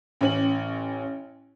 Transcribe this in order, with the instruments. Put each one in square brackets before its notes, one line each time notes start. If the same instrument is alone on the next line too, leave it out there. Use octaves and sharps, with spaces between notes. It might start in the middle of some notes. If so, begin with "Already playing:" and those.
[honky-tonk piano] A1 C#4 F#7